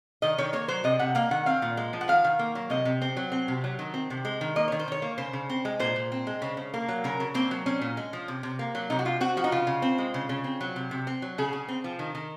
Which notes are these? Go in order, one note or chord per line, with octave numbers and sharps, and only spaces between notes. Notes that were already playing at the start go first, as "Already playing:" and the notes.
D#3 D#5
D#3 C#5
A#3 C#5
F#3 C5
C3 D#5
C3 F#5
A#3 F5
D#3 F#5
C4 F5
A#2
G#3
F3
F#5
D#3 F5
D#3
A#3
F#3
C3 D#5
C3
C4
F#3
C4
C3
F#3
D#3
C4
C3
G#3
D#3
A#3 D#5
D#3 C#5
C5
D#3 C#5
A#3
C#3 C5
C#3
C4
G#3
A#2 C5
A#2
C4
G#3
C#3
C#3
A#3
F#3
C#3 A#4
C#3
A#3 C4
F#3
C4 C#4
A#2
G#3
F3
C3
C3
A#3
F#3
C3 D#4
F#4
C3 F4
C4 F#4
F3 F#4
D#4
C#3 F4
C#3
C4
G#3
C#3
C#3
C4
F#3
C3
C3
C4
F#3
C#3 G#4
C#3
C4
F3
D#3
D#3